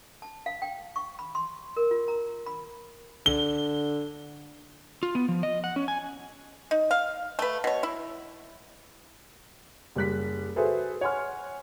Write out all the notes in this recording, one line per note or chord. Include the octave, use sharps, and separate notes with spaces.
A5
F5
G5
C#6
B5
C6
A#4
F4
A#5
B5
D3 G7
F4
B3
F3
D#5
F#5
C#4
G#5
D#4
F5
A3 B4
B2 C#5
E4
F#1 G3 F#6 B6
F#4 G#4 A4 B4 C5 E5
C#5 F#5 G#5 C6 F6